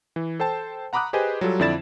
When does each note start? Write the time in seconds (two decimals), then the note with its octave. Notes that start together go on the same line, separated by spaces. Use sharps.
0.16 E3
0.40 A4 C5 G5 A5
0.93 F#5 A#5 B5 D6 D#6 F#6
1.13 G4 G#4 B4 C5 D#5 G#5
1.41 F#3 G3 F4 A4
1.59 F2 D3 E4 D5 A6 E7